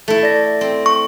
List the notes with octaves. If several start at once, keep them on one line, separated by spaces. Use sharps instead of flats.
A3 E4
D5 A#6
C4
C#6